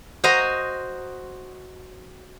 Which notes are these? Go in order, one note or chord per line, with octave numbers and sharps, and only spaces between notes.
F#4 C5 D#5 A#5